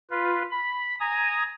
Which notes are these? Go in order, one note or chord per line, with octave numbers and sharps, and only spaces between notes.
F4 B4
B5
G#5 A#5 D#6